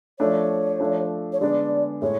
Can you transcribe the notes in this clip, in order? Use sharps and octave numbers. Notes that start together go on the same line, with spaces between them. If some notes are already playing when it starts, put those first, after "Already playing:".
F3 A3 D4 C#5
F3 A3 D4
C#5
D3 G#3 B3 D4 D5
A2 G#3 C#5